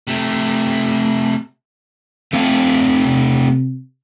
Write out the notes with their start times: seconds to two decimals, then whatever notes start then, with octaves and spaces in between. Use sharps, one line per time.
0.07 C3 A3
2.33 A3 C4 F5
3.05 C3